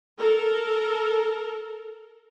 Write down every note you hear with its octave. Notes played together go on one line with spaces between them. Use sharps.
A4 A#4